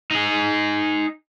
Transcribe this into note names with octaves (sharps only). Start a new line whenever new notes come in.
D#4 G#4